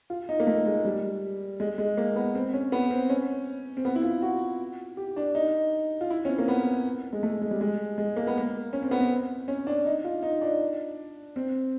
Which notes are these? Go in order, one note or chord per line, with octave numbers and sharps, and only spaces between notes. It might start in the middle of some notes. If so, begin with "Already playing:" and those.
F4
D#4
A#3
A3
G#3
G3
G#3
G#3
A#3
B3
C4
C#4
B3
C4
C#4
C4
B3
E4
F4
F#4
G4
D4
D#4
F4
E4
C#4
C4
A#3
B3
G#3
A3
G#3
G3
G#3
G#3
A#3
B3
A#3
C#4
C4
B3
C4
C#4
D4
D#4
F4
D#4
D4
C4